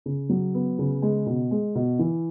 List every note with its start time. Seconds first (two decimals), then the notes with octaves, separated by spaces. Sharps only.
0.06 C#3
0.29 F#3
0.54 B3
0.79 C#3
1.02 G#3
1.26 B2
1.51 G#3
1.75 B2
1.99 E3